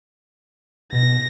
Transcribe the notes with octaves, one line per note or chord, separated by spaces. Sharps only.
B2 A#6